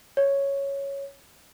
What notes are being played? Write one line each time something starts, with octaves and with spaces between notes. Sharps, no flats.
C#5